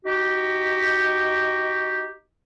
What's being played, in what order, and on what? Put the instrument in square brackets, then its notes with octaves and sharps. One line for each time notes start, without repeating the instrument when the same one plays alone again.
[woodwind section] D#4 F#4 G4